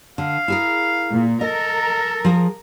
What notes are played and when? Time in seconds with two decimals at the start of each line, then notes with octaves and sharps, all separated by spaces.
0.18 D3 F5
0.48 E4 G#4 A#4
1.10 A#2
1.41 A4 A#4 D#5
2.25 F3 G#4